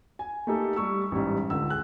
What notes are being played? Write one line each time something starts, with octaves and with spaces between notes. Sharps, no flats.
G#5
A3 A#3 D#4 G4 A4
G3 C#6 E6
A1 G#2 G3
C#2 D3 E6
G#4 F#6